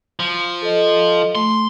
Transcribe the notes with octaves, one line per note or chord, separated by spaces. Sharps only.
F3
A4 D#5
A3 C6